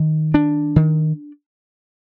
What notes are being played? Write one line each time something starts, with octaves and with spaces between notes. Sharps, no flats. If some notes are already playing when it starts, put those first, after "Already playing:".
Already playing: D#3
D4
D#3